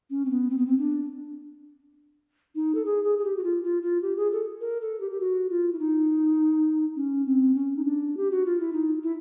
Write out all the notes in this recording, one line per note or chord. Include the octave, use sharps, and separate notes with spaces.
C#4
C4
B3
C4
B3
C4
D4
D#4
A4
G#4
G#4
G#4
G4
F#4
F4
F4
F4
G4
G#4
A4
A#4
A4
G4
G4
F#4
F4
E4
D#4
C#4
C4
C#4
D#4
D4
G4
F#4
F4
E4
D#4
E4